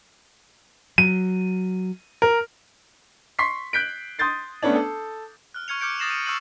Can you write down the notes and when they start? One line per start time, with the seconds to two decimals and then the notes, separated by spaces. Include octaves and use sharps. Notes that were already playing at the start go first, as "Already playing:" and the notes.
0.98 F#3 D#7
2.22 A#4
3.39 C6 C#6 B6 C7
3.73 F#6 G6 B6 D7
4.19 C6 D#6 G6 A6 C7
4.62 A3 B3 C#4 D4
4.76 A4
5.54 F6 F#6
5.68 C#6 F6 G#6 C#7 F7
5.81 D6 F6 G6 C#7 D7
5.99 D#6 A6 A#6 C7 E7 F#7
6.10 D#7
6.26 C#6 E6 F6 G6 C#7 F#7